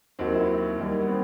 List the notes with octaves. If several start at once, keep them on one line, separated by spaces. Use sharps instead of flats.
D#2 D#3 F#3 C4
E4
D#2 D#3 G3
B3
C4